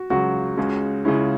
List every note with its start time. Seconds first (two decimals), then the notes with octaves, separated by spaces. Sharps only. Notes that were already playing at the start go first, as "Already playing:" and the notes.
Already playing: F#4
0.10 C#2 C#3 F#3 F#4
0.57 C#2 C#3 G#3 C#4
1.05 C#2 C#3 G#3 C#4 E4